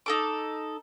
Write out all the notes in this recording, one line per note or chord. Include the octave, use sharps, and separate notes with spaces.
D#4 A4 D6